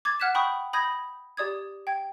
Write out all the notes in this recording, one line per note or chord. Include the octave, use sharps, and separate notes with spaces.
D6 G#6 A6
F#5 F6 F#6 G#6 B6 E7
G5 B5 C#6 D#6 G6
B5 D#6 G6 G#6 A#6
G4 D5 D#6 G#6
G5 G#6